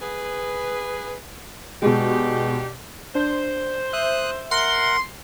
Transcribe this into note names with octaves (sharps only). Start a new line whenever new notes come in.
G#4 B4
B2 G#3 D4 D#4 G4
D4 C5
E5 D#6 F#6
A#4 F#5 C6